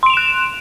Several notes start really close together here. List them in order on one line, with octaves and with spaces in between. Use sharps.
C6 D7 F7 E7 F#6